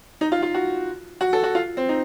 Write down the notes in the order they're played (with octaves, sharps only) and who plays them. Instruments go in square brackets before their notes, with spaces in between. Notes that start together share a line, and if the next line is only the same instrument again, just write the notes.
[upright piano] D#4
F4
F4
F#4
F#4
A4
F#4
F4
C4
D#4